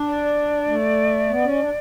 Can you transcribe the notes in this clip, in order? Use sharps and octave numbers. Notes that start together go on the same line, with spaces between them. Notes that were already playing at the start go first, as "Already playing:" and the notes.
Already playing: D4
D5
A3
B3
C#4
D4